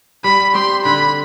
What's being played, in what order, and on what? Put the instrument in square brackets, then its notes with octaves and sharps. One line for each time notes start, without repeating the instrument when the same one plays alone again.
[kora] G3 [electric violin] B5
[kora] C4 G4 [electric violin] C6
[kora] D3 [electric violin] B5